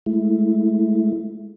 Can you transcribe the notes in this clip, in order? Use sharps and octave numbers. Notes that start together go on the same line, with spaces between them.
G#3 A3 E4